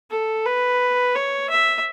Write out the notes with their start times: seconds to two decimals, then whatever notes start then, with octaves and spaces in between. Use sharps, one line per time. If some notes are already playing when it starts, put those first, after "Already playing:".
0.11 A4
0.45 B4
1.15 C#5
1.50 E5